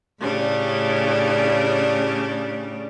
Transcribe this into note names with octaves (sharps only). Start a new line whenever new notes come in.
A2 C#3 G3 D4